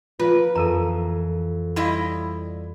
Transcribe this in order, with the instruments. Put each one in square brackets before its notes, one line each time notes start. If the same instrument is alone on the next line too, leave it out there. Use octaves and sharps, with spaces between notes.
[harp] F3 A#3 [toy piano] F4 [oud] B4
[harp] F2 E3 [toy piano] A4 A#4 A#5
[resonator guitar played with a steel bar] G3 E4 D#5 [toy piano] F5 B5 C6